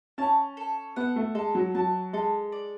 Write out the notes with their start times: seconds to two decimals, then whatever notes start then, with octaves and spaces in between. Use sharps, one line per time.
0.18 C#4 A5
0.57 A4
0.96 B3 F#5
1.16 A3
1.35 G#3 A4
1.55 F#3
1.75 F#3 A5
2.13 G#3 A4
2.52 D5